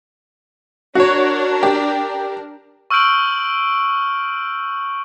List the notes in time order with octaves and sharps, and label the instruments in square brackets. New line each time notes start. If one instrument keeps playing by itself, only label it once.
[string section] D4 A#4 [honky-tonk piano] F#4 C#5
[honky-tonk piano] G4
[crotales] C#6 E6 F6 G6 D7 F#7